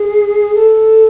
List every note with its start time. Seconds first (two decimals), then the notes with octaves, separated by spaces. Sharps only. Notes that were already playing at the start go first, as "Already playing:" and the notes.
Already playing: G#4
0.55 A4